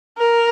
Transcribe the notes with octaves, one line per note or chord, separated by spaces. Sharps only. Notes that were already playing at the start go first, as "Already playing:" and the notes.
A#4